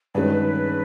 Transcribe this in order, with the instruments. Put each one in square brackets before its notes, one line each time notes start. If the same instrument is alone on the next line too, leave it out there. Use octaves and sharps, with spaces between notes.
[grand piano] G2 D#3 G#3 C#4 [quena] B4